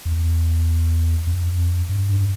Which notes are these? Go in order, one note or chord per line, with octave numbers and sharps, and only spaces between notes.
E2
F2
G2
G2